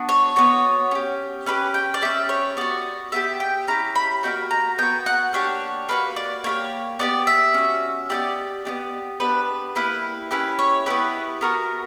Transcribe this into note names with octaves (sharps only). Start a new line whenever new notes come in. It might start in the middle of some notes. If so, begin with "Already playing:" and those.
Already playing: B3 D4 F#4
C#5
B3 F#4 C#5
C#4 G4
C#4 E4 G4 B4
G5
D5
C#4 G4 E5
C#5
B3 F#4 D5
B3 E4 G4 E5
G5
C#4 E4 G4 A#5
B5
A#3 D4 F#4 G5
A#5
B3 F#4 G5
F#5
A#3 D4 G4 C#5
A#3 D4 F#4 B4
D5
A#3 E4 G4 C#5
B3 D4 G4 D5
E5
C#4 F#4
B3 E4 G4 D5
B3 D4 G4
B3 D4 G4 B4
A#3 E4 G4 B4
C#4 E4 G4 B4
C#5
B3 E4 G4 B4
B3 F#4 A#4